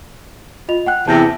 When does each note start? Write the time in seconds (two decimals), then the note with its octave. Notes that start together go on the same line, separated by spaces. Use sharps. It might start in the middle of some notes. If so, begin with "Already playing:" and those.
0.69 F4 D#5 F7
0.86 F#5 G5 F#6
1.07 E2 C3 A5 G6 A#6